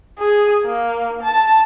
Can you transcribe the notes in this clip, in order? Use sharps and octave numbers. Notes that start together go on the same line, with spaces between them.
G#4
A#3
A5